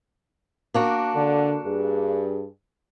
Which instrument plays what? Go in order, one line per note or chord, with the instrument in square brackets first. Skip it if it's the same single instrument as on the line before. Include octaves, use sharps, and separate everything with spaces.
[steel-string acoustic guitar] A#3 D4 F#4
[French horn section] D3
G2 G#4